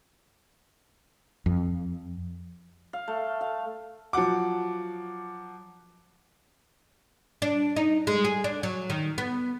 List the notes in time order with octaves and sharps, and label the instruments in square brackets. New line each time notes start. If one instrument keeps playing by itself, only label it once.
[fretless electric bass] F2
[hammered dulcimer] F5
A3
F5
[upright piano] F3 F#3 F#5 D6
[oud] D4
D#4
G#3
G#4
D4
F#3
D#3
B3